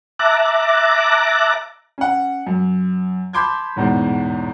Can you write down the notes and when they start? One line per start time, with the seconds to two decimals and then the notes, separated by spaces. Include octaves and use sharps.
0.19 E5 A5 A#5 D6 F#6
1.98 C#4 F#5
2.47 F#2
3.33 A5 B5 C6 D6 G6 G#6
3.76 A1 E2 G#2 B2